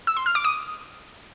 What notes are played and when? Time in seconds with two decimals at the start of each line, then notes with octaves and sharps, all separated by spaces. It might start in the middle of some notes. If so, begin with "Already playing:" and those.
0.07 E6
0.17 C6
0.26 F6
0.35 D6
0.44 D#6